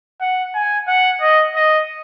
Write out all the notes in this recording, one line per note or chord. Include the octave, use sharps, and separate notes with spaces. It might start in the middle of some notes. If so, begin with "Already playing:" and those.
F#5
G#5
F#5
D#5
D#5